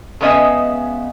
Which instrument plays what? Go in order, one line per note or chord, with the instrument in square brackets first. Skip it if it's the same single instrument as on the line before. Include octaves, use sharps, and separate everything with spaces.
[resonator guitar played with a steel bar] C#3 G#3 B3 C#4 D#5 E5